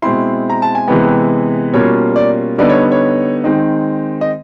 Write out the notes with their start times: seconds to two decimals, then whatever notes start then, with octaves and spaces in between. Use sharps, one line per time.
0.02 B2 G#3 C4 E4 C6
0.50 A#5
0.62 A5
0.75 G#5
0.87 C3 E3 G#3 B3 G5
1.73 B2 G3 A#3 C#4 F4 C#5
2.16 D5
2.58 D3 G3 B3 D#4 D5
2.70 C#5
2.92 C#5
3.44 D#3 G#3 C4 D#4
4.21 D#5